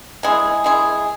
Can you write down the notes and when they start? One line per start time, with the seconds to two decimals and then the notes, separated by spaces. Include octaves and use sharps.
0.23 G#3 E4 G#4
0.64 G#3 E4 G#4